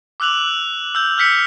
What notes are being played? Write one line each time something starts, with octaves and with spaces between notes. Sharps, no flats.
D6 E6 F#6 F7 F#7
E6 G6
F6 G6 B6 C#7